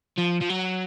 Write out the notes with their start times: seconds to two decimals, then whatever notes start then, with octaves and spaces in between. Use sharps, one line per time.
0.18 F3
0.42 F3
0.50 F#3